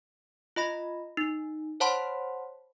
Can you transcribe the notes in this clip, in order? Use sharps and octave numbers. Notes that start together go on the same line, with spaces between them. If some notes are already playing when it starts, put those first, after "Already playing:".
F4 D#5 B5 A#6
D#4
C5 C#5 F#5 A5 B5 C6